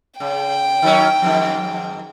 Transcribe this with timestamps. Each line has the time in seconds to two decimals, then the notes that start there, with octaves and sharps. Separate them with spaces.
0.20 C#3 G5
0.82 D#3 F#3 C#4
1.22 F2 G#2 D#3